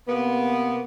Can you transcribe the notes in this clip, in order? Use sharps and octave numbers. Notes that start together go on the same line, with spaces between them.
C3 A#3 B3